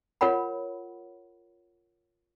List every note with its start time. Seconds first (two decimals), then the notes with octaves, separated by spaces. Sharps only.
0.21 F4 A#4 C#5 F#5 B5